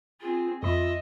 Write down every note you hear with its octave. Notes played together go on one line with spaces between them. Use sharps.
C4 F4 G#4
F2 F4 D#5 E5 B5